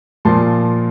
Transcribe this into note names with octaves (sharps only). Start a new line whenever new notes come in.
A#2 F3 A5 C6